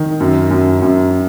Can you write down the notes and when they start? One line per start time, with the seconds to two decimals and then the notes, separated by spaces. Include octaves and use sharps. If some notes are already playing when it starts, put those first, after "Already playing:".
Already playing: D#3
0.20 F#2
0.51 F#2
0.82 F#2